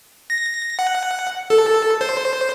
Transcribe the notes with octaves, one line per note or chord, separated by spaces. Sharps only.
A#6
F#5
A4
C5